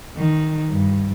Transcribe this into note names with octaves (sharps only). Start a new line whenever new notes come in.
D#3
G2